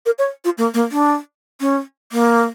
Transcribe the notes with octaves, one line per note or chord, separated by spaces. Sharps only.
A#4
C#5
F4
A#3
A#3
D4
C#4
A#3